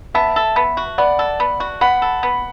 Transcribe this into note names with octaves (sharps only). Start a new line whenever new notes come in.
B3 E5 A5
A4
B3
F#4
B3 D5 F#5
A4
B3
F#4
B3 F#5 B5
A4
B3